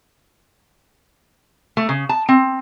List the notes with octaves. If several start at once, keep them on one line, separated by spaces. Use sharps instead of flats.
A3
C#3
A5
C4